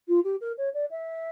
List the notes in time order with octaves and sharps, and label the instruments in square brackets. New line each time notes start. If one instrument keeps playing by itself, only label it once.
[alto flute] F4
G4
A#4
C#5
D5
E5